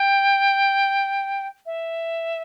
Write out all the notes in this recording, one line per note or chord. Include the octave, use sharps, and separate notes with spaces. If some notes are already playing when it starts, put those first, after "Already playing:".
Already playing: G5
E5